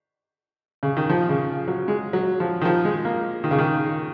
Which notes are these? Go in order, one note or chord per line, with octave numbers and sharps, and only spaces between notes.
C#3
D#3
F3
C#3
F#3
G#3
F#3
F3
D#3
F3
G#3
A#3
D#3
C#3
D#3